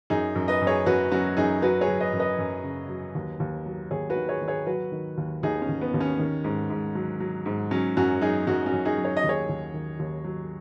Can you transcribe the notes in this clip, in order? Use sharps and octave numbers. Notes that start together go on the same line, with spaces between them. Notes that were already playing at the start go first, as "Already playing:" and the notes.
F#2 D#4 G#4
F#2
B4 D#5
F#2
G#4 C#5
F#2 F#4 B4
F#3 C#4 F#4
F#2 D#4 G#4
F#3 F#4 B4
G#4 C#5
F#3
B4 D#5
F#2
B4 D#5
F#2
C#3
F#3
D#2
D#2
F#3
D#2 G#4 C#5
F#4 B4
D#3
G#4 C#5
D#3
G#4 C#5
F#3 F#4 B4
D#3
D#2
D#2 D#4 G#4
C#4
D#2
B3
D#2
C#4
D#3
G#2
G#2
F#3
F#3
G#2
F#3 C#4
F#2 C#4 F#4
F#3 D#4 G#4
F#2 C#4 F#4
C#4 F#4
F#2
D#4 G#4
F#3
C#5
D#5
D#2
G#4 C#5
D#2
D#3
D#2
F#3